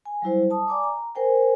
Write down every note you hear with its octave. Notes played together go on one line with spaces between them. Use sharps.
G#5
F#3 G3 E4 C5
A5 D#6
D5 G#5 A#5 D6
A#5
A#4 C5 G5 G#5